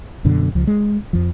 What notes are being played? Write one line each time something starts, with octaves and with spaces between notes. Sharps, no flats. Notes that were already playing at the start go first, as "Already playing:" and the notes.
F#2 B2 D3
C#2 F3
G#3
F2 F3